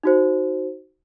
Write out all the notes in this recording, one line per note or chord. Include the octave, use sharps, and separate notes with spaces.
D#4 F#4 C5